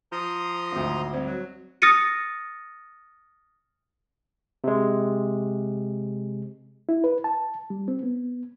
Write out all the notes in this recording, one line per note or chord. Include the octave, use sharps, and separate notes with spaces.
F3 A#5 C6 D#6
G#1 D2
G3 C4 C5
F#3
D#6 F6 A6 A#6 C#7 D#7
C3 G#3
E4
B4
A5
G3
C4
B3